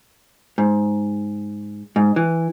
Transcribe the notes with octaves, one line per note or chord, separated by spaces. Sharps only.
G#2
G#2
E3